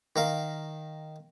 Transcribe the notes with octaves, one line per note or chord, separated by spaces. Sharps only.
D#3 A#4 F5